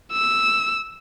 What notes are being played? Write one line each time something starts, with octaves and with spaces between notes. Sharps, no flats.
E6